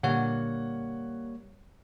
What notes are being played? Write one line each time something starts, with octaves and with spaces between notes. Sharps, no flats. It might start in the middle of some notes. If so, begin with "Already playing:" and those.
A#2 D3 G3 A#3 C#5 F#5